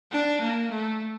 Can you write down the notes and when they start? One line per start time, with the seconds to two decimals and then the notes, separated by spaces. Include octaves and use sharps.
0.11 D4
0.41 A#3
0.70 A3